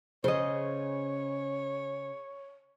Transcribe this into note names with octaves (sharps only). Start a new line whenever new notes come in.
C#3 C5 C#5 D#5